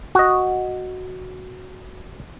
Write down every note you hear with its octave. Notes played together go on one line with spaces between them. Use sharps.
F#4 D#5